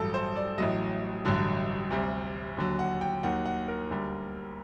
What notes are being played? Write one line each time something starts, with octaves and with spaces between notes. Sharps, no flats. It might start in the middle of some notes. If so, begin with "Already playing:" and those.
Already playing: A1 G2 F#3 A4
C5
D5
A1 A2 F#3 D#5
A1 G2 D3 F#3
D2 C3 G3
D#2 D3 F#3
F#5
G5
D#2 D#3 F#3 F#5
F#5
A#4
D2 D3 G3